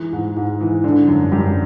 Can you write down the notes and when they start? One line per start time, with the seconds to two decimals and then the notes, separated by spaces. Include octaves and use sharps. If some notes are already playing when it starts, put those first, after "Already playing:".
Already playing: E3 G#3
0.13 G#2
0.37 G#2
0.61 E3
0.84 D3
1.07 F#2
1.31 F#2 G3 G4